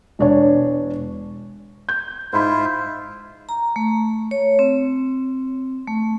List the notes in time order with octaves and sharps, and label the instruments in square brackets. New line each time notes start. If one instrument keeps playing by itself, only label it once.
[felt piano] E1 D4 C#5
G6
[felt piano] G#2 B5 [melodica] E4 F4 C5
[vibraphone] A#5
A3
C#5
C4
A3